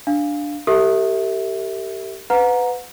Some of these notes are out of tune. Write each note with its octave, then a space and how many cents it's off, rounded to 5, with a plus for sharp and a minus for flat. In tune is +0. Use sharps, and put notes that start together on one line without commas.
D4 +0 F5 +0
G4 -15 A#4 -45 E5 -15
B4 +20 F#5 -35 A#5 +5